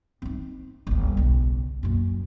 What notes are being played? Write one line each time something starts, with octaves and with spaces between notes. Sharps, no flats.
C4 D#4
G1 D2
B1 C#3
F#2 A#2